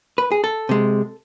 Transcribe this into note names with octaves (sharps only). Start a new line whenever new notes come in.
B4
G#4
A4
C3 G#3